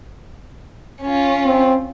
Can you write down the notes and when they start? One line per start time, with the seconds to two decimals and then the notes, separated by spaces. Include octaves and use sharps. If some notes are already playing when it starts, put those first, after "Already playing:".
1.02 C#4 F4
1.46 C4